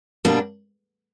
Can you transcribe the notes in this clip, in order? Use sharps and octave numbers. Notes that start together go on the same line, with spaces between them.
B2 G3 A#3 D4